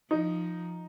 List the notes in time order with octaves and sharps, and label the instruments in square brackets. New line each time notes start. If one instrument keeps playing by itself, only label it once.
[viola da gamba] F3 [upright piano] D#4